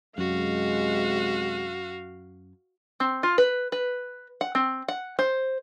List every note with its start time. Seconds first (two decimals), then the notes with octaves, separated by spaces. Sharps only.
0.18 F#2 C3 G#3 F#4 F5
3.00 C4
3.23 F4
3.38 B4
3.72 B4
4.41 F#5
4.55 C4
4.88 F#5
5.19 C5